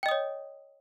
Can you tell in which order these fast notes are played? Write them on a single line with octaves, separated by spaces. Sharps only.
G5 D#5 D#6 C#5